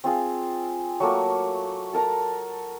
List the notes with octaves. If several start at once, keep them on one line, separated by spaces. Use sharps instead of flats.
C4 F4 G#4 F5
F#3 A3 A#3 C#6
A4 A#4 A5 A#5